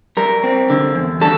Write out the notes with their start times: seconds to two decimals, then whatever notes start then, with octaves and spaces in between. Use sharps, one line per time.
0.17 G3 A#4
0.44 C4
0.70 D3
0.95 E2
1.21 G3 A4